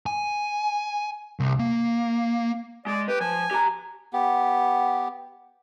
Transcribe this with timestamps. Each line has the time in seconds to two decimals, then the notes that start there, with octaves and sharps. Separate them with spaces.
0.06 G#5
1.40 C2
1.59 A#3
2.86 G#3 D5
3.08 G4 B4
3.21 F3 G#5
3.51 G4 A#5
4.13 B3 G4